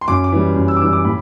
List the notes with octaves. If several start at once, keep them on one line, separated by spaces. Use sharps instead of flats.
C6
F#2 D6
D6
E3 G3
F#2
E6
D6
E3 G3 E6
D6
A2 B5